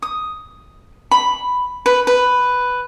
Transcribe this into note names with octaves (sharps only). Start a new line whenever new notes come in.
D#6
B5
B4
B4